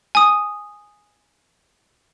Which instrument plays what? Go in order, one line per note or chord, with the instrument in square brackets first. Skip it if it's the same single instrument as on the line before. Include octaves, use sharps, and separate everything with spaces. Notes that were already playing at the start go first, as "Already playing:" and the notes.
[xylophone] G#5 D#6